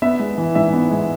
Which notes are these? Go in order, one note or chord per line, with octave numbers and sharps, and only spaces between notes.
B3 E5
G#3
E3
G#2 E5
B3
G#3